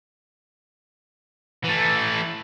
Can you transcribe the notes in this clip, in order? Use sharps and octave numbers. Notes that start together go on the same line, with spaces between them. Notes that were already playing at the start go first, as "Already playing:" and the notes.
E3 A3